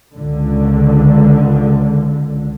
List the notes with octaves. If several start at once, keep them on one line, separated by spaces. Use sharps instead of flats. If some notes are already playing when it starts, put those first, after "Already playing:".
C#2 D3